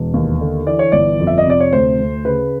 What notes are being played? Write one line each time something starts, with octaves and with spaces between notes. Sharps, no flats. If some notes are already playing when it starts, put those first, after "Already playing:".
Already playing: E1
D#2
D3
E3 D5
C#5
G1 D5
F2
E5
D#5
C3 D5
C#5
D2 C5
D2
C#3 B4